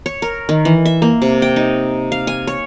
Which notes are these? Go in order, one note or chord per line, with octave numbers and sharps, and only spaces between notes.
C#5
A#4
D#3
E3
E5
A#3
C3
G5
D#4
F5
G#5
C#5